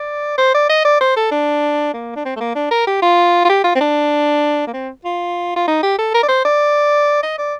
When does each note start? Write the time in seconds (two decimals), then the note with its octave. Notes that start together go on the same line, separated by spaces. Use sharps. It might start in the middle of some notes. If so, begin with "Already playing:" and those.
Already playing: D5
0.38 C5
0.55 D5
0.69 D#5
0.85 D5
1.01 C5
1.17 A4
1.31 D4
1.94 A#3
2.16 D4
2.25 C4
2.36 A3
2.40 A#3
2.56 D4
2.71 A#4
2.87 G4
3.02 F4
3.45 F4
3.50 G4
3.64 F4
3.75 C4
3.81 D4
4.67 A#3
4.73 C4
5.05 F4
5.56 F4
5.68 D#4
5.83 G4
5.99 A4
6.14 A#4
6.23 D5
6.29 C5
6.45 D5
7.23 D#5
7.39 D5